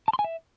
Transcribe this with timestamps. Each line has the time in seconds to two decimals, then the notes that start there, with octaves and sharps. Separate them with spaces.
0.08 A5
0.13 C6
0.19 G#5
0.24 E5